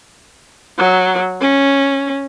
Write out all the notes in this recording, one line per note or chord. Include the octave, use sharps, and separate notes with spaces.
F#3
C#4